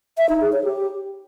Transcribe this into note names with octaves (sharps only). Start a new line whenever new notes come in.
E5
D#4
G#4
C#5
G4